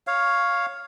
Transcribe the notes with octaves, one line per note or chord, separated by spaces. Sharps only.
C#5 F5